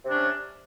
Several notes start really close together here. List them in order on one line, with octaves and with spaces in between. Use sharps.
C3 D4 C#4